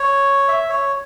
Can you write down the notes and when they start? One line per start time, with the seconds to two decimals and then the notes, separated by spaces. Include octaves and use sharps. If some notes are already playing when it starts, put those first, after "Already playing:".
Already playing: C#5
0.48 E5
0.69 C#5